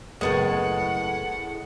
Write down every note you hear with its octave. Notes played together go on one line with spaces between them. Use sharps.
F#1 A2 D3 G#3 B3 F#5 A6